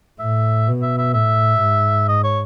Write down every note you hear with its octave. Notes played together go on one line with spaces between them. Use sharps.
A2 E5
B2
E5
E5
A2 E5
G#2
D#5
C#5